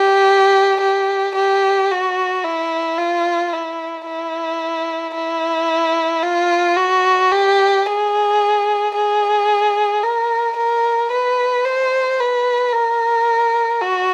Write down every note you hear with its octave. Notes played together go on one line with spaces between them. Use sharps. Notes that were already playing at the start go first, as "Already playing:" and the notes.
Already playing: G4
G4
G4
F#4
E4
F4
E4
E4
E4
F4
F#4
G4
G#4
G#4
A#4
A#4
B4
C5
B4
A#4
F#4